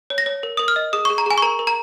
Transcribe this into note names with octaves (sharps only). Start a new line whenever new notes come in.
C#5
A#6
C#5
A#4
A#4 D#6
F6
D#5
G#4 D#6
G#4 C#6
A#5
G#4 G#5
C#6
A#4 A#5
A#4
A#5